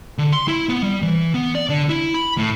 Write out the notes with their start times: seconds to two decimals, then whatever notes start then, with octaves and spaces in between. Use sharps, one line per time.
0.18 D3
0.32 C6
0.48 E4
0.69 B3
0.83 G3
1.02 E3
1.34 B3
1.55 D5
1.69 D3
1.89 E4
2.14 B5
2.38 A2